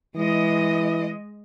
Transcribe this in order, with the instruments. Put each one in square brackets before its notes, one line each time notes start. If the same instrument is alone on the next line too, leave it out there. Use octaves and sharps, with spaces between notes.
[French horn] E3 [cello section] G#3 D#5